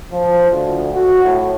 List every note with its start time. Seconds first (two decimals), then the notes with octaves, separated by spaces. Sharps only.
0.12 F3
0.50 D2
0.93 F#4
1.24 A2